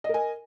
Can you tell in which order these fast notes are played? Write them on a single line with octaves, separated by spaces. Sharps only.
D#5 A#4 G#5